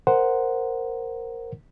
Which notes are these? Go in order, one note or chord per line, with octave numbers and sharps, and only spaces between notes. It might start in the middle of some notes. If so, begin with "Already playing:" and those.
A#4 C5 F#5